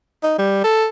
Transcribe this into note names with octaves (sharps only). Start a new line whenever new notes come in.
D#4
G3
A4